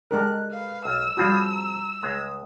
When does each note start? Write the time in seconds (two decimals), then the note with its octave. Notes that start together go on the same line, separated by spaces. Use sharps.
0.11 G#3 D4 G4 A4 A#4 F#6
0.51 B4 F5
0.85 B1 E6 F6
1.17 F3 G3 C4 F4 F#4 G#4 B5
1.51 A#5
2.02 C#2 G#3 A#5 D#6